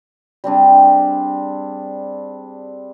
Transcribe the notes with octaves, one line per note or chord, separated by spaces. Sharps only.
G3 C4 D4 G#4